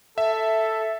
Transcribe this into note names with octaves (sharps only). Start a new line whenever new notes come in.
A4 E5